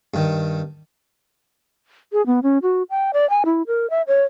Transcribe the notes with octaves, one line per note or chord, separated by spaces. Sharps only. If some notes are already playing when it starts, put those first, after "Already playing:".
G2 D#3
G#4
B3
C#4
F#4
G5
D5
G#5
E4
A#4
E5
C#5